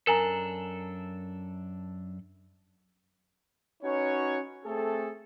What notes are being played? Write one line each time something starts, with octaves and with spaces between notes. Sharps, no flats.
F#2 D4 A4 A#4 G#5 A#5
C#4 D#4 F#4 B4 C#5
A3 C4 G#4 A4